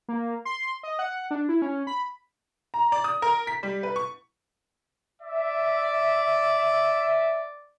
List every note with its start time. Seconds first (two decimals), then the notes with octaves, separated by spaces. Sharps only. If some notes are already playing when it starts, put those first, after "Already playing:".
0.08 A#3
0.45 C6
0.83 D#5
0.99 F#5
1.31 D4
1.49 E4
1.62 C#4
1.87 B5
2.74 A#5
2.92 D5
3.04 D#6
3.22 A#4
3.47 B6
3.63 G3
3.83 B4
3.96 C#6
5.22 D5 E5